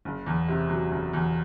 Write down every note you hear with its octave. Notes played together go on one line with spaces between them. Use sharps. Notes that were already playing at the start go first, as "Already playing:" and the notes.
F#1
E2
C3
F#3
F#1
E2